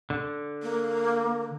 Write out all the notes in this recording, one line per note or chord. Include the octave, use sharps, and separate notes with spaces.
D3
A#3